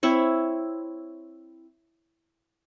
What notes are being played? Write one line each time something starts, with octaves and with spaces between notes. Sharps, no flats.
C4 E4 C#5